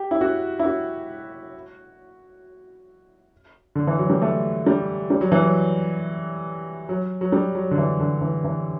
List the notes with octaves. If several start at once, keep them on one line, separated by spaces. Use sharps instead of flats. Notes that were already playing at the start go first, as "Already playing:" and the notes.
Already playing: G4
E4
F#4
E4
F#4
D3
E3
F#3
G3
A3
G3
G3
F#3
E3
F#3
F#3
F#3
G3
F#3
D3
E3
D3
E3
E3